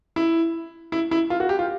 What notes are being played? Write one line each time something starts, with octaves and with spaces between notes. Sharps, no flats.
E4
E4
E4
F4
F#4
G4
F4